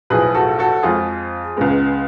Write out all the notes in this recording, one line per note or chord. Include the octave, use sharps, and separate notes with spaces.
B1 A2 F3 G#4 B4
F#4 A4
F#4 A4
F2 F3 G#3 F4 G#4
C#2 C#3 G#3 B3